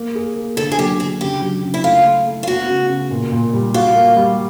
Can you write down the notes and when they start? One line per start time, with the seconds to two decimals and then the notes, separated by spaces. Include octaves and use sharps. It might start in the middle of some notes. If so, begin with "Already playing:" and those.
Already playing: A#3
0.15 G#4
0.36 A#3
0.57 D3 A4
0.72 G#4
0.78 F#3 G4
1.00 D3 G#4
1.21 C#3 G4
1.42 F#3
1.63 C#3
1.74 E4
1.84 A3 F4
2.05 A3
2.26 A3
2.43 F4
2.47 B3 F#4
2.68 C#3
2.89 C#3
3.11 A#2
3.32 A#2
3.53 G3
3.74 F4 F#4
3.95 A#3
4.16 G3